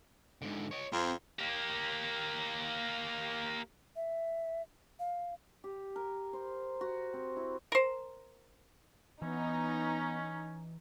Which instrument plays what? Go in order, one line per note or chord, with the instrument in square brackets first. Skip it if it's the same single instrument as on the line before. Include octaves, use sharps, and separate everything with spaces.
[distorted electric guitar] G#2 D3
C#5 D#5
[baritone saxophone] F2 [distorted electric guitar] C4
[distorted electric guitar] A#3 G4
[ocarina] E5
F5
[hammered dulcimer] G4
A#4
C5
F#4
C4
E4
[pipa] A#4 C5
[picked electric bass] E3 [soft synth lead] B3 [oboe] C#4 [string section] D#4